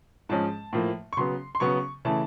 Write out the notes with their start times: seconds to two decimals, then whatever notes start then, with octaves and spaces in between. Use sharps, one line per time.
0.29 G#2 F3 G#3 C#4 A5
0.73 A2 F3 A#3
1.13 C#6
1.17 C#3 F#3 B3 C6
1.55 C6
1.60 C#3 F#3 B3 C#6
2.05 C#3 E3 A3 A5